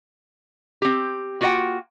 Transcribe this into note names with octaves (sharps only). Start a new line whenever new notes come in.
C4 G4
A#3 F4 F#4 D5 F#5 G5